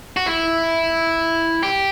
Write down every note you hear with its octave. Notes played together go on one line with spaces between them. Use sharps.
F#4
E4
G4